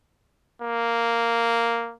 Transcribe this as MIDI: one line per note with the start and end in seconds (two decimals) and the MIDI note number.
0.62 1.95 58